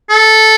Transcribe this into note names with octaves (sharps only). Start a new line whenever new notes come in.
A4